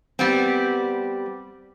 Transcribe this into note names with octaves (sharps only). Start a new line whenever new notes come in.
G3 B3 C4